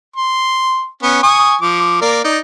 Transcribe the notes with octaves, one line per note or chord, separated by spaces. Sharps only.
C6
B3 C#4
G#5 C#6 D#6
F3 D6
A#3 A#4 D5
D#4 D5